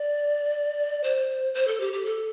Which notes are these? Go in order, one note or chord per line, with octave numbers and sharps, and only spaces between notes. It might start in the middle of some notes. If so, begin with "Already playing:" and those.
Already playing: D5
C5
C5
A4
G4
G4
A4